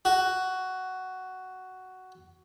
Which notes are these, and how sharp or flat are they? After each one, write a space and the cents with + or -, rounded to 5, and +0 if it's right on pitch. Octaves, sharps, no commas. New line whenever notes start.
F#4 +10